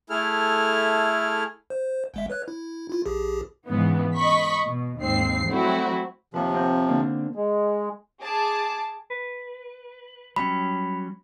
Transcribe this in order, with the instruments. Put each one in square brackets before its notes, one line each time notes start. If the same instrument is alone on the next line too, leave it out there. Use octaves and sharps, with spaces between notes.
[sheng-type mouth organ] A3 E4 G#4 A4 F6
[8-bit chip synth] C5
G1 G#3 E5
B4 C#5 F#6
E4
E4 F4
A#1 G4 G#4
[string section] G#2 C#3 E3 B3
D#5 B5 C#6 B6
B2
D#2 G#2 C4 C7
F#3 G3 A3 C4 E4 F#4
[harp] D#2 B4 [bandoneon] C3 F3
[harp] C4 F#5 G6
D3 A#3 D4
[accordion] G#3
[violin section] G#4 A5 D6
[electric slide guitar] B4
[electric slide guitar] F#3 G3 C#4 [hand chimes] B5